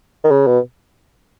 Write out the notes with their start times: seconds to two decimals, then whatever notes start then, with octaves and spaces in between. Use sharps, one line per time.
0.24 D#3
0.31 C#3
0.47 B2